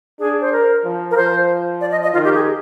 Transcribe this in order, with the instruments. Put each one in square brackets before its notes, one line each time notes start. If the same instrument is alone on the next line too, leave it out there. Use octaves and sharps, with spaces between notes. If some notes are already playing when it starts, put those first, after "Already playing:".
[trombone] D4 [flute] G#4
[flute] C5
A#4
[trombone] F3
[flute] A#4
[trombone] F3 [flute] C5
[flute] D5
D#5
D#5
[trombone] D#3 [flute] F4
[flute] G4
G#4